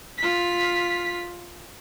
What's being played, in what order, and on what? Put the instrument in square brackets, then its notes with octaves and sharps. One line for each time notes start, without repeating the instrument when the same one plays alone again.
[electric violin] F4 B6